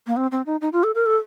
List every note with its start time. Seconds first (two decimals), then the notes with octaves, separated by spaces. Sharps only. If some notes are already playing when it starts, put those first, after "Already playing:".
0.07 A#3
0.17 C4
0.32 C4
0.46 D#4
0.61 D#4
0.73 F4
0.83 A4
0.95 A#4
1.06 A4